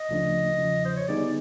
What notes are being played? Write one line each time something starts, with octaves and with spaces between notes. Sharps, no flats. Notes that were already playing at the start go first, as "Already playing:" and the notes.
Already playing: D#5
D2 C#3 F3 A3 D4
E2 C#3 F3
C5
C#5
D3 G3 B3 D#4 G#4 D5